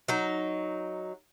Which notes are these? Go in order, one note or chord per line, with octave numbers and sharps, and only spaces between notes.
F#3 D#4